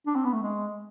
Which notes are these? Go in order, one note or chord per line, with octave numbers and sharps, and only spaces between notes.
D4
C4
B3
A3
G#3